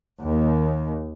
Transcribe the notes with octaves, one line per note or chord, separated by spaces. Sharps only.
D#2